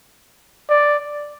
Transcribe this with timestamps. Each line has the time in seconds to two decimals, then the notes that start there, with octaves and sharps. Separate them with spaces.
0.70 D5